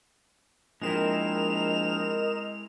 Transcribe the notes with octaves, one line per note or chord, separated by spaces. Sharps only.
A#1 G#3 C4 E4 A#4 D#5 E7 F7